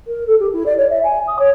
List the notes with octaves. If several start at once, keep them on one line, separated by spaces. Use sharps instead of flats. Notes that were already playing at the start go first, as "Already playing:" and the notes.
A#4
A4
G4
E4
D5
C#5
E5
G#5
D#6
C#5